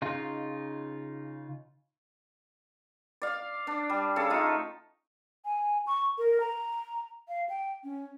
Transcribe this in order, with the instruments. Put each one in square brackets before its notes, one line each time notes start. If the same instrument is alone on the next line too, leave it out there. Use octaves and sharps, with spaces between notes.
[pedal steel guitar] C#3 D#4 F4
[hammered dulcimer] D5 F5
D4
G3
C#3 A4
A3 D#4 F4
[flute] G#5
C#6
A#4
A#5
F5
G5
C#4